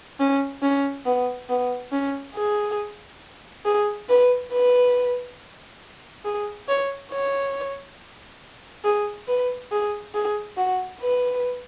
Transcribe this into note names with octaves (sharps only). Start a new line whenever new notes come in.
C#4
C#4
B3
B3
C#4
G#4
G#4
B4
B4
G#4
C#5
C#5
G#4
B4
G#4
G#4
F#4
B4